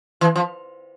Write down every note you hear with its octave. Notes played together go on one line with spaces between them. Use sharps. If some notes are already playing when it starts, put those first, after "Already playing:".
E3
F3